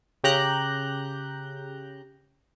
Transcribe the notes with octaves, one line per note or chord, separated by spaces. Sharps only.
C#3 G4 A#5 F#6 G6